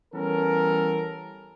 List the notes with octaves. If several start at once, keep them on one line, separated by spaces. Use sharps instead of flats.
E3 G3 B3 C#4 A4 A#4